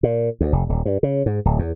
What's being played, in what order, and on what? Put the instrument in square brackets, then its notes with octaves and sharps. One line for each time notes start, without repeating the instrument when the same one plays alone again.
[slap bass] A#2
D2
F1
D#1
G2
C#3
G#2
D1
E2